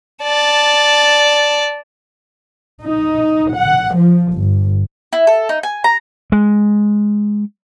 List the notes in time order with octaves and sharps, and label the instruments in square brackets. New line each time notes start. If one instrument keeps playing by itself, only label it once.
[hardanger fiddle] D5 A5
[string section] D#4
F#5
F3
G1
[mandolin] E4
A4
D#4
G#5
A#5
[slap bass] G#3